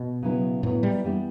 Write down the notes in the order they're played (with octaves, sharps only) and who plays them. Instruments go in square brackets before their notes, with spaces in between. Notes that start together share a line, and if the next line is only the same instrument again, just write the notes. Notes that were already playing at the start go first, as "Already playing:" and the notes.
Already playing: [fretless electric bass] B2
[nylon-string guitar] C#3 F#3 B3 E4
[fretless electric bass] A2 [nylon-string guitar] C#3 F#3 B3 E4
[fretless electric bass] G3
[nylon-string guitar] E3 G3 B3 E4 G4